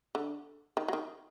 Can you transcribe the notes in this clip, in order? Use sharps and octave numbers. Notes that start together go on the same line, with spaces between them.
D3
D#3
F#3
D#3